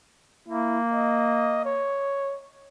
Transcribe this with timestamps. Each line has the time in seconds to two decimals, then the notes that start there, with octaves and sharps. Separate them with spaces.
0.48 A#3 E4
0.94 D#5
1.65 C#5